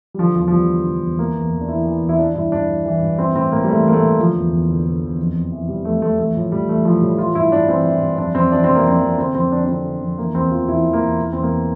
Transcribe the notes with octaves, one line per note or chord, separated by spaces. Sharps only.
G3
D3 F3
E2 F3
F3
E2 G3
D3
D3
E2
E3 A#3
E2
E2
D4
E3 E4
E3
E2
E4
E3 D4
G2 E4
G2 D4
E3
E3
G2
E3 C4
A2 C4
A2 A#3
G3
E3 A3
E3 A#3
A3
A2
D3 F3
E2
E2
D3
D3
E2
F2
F2
E3
C3 G3
F2 A3
F2 A3
E3 A3
A2 F3
A2 G3
E3 A3
E3 F3
A2 G3
E3 F4
G2 E4
G2 D4
E3 C4
E3
G2
F2 D4
F2 C4
E3 D4
C3 C4
A#3
F2 C4
F2
D3 C4
F2 C4
F2 D4
D4
D3 C4
D3
F2
E3 A#3
E2 C4
E2 F4
E3 E4
E3
A#3
E2
E3
E2 C4
A#3